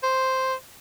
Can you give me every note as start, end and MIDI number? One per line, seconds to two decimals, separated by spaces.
0.03 0.54 72